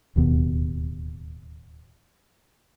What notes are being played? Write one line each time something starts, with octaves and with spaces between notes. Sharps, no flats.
D1 D#2 B2